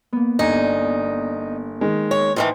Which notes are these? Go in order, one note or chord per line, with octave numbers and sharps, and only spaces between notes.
A#3 B3
G1 D#4 D5 G#5
D#3 G#3
C#5
A2 D#3 E3 C5